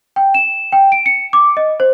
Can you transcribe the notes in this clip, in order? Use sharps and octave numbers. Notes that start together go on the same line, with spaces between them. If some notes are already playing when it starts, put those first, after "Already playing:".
G5
E7
G5
D7
C#7
D6
D#5
C5